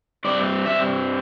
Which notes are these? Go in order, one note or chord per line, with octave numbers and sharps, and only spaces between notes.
G2 G3 C4 D5
E5